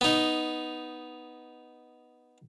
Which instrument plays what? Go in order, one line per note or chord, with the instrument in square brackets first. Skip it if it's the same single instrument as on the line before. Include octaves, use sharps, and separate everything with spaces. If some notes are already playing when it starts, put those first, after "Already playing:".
[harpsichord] B3 D#4